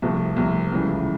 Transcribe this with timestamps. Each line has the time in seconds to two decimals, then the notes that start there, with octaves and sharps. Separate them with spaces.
0.02 C2 C3 F3 A3
0.36 C2 C3 F3 A3
0.72 C#2 C#3 E3 G3